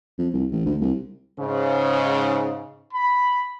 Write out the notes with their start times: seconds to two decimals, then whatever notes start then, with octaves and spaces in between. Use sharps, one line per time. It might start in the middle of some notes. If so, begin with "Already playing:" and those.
0.18 F2
0.33 C2
0.52 A1
0.66 D2
0.81 C2
1.40 G#2 C#3
2.93 B5